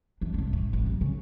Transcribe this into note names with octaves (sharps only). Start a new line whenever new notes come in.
E2 D4
F1 G2
A2
A1
F#3
C#3